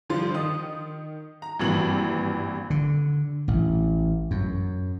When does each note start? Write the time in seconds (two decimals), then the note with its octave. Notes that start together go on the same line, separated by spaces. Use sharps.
0.10 D3 F3 G3 F4
0.34 D#3 D#6
1.42 A#5
1.59 G#1 G2 A#2 E3 F#7
2.70 D3
3.48 A1
4.31 F#2